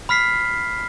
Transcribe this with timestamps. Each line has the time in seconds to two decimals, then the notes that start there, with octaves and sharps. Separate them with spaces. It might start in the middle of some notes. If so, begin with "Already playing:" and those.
0.09 B5 F6 B6 C7